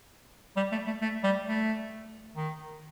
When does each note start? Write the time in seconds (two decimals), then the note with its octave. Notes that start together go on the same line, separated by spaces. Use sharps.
0.56 G3
0.72 A3
0.87 A3
1.01 A3
1.24 G3
1.46 A3
2.36 D#3